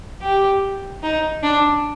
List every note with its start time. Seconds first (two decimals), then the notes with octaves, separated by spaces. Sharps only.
0.22 G4
1.03 D#4
1.43 D4